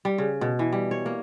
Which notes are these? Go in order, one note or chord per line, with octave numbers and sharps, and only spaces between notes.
G3
C#3
B2
E3
G3
C#5
A#3